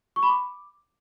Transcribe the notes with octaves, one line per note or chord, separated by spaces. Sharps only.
C#6
B5
D6